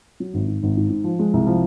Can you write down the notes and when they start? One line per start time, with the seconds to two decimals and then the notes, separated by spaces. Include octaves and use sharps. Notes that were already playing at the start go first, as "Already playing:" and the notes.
0.20 F#3
0.34 G#1
0.47 G#2
0.63 G#1
0.77 G#2
0.90 G#2
1.04 F3
1.19 G#3
1.33 C2
1.47 F3